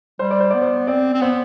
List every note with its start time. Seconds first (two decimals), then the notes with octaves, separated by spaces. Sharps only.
0.19 G3 C5
0.31 D5
0.40 C5
0.50 B3 D5
0.62 C5
0.87 C4 D5
1.14 C4
1.21 B3 C5